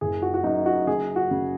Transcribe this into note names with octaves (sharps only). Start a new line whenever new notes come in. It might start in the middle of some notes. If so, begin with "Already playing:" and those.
F#1 G#4
F#4
F#4
F#2 D#4
F#4
C#3 G#4
F#4
C#3